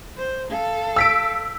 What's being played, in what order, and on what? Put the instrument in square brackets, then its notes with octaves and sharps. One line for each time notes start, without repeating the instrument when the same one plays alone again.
[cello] C5
A4 F5
[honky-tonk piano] E6 B6 D7